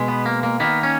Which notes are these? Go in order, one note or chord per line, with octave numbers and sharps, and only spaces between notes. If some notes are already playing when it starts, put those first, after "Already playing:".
Already playing: B2 G#3
B3
A#3
A#3
D#3 A#3 B3
C#4